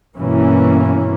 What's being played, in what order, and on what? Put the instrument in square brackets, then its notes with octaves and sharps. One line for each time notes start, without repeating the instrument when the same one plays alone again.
[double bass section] G2 B2 E3 A#3 C#4